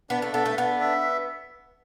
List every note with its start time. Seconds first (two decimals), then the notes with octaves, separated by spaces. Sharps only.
0.10 B3 D4
0.22 A3
0.33 B3 A4
0.46 A3
0.57 B3 D4
0.81 E5